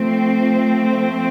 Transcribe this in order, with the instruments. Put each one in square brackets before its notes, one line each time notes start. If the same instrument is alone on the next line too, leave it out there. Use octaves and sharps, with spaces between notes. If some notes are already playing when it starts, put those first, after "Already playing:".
Already playing: [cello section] F3 A3 C4